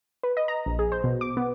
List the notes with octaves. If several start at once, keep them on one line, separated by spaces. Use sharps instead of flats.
B4
D#5
A#5
A#1
G#4
C5
B2
D6
B3